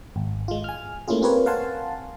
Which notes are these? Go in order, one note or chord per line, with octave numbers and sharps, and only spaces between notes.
G#1
G#3 F4
G#5 F6
A3 A#3 C#4 E4 F4 G#4
C4 F4 G4 A#4 B4 C#5
A#4 F5 F#5 G#5 A5 C6